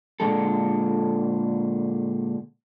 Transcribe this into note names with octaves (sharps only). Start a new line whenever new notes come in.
A#2 D3 D#3 G#3 A4